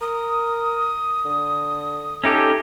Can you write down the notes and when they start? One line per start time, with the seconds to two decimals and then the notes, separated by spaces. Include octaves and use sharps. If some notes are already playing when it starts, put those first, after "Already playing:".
0.01 A#4 D#6
1.25 D3
2.24 C#4 D#4 G4 A4 E5